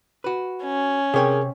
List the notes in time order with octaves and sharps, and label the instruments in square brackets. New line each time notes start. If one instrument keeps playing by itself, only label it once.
[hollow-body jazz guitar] F#4 B4
[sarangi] C#4
[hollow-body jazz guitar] C3 C#5 [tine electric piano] G#4 A#4 G5